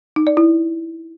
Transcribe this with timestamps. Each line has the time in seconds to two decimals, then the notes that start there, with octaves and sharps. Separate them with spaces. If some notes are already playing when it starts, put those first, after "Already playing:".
0.16 D#4
0.27 D5
0.37 E4